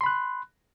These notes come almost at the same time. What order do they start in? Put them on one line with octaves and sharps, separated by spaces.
C6 B5 F#6